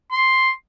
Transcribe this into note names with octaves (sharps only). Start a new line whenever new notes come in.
C6